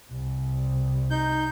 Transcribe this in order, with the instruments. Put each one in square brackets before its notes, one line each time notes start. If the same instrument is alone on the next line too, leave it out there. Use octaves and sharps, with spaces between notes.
[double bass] C2
[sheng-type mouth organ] D#4 G6